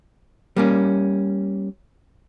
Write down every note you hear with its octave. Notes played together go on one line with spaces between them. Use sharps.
G3 A#3 C#4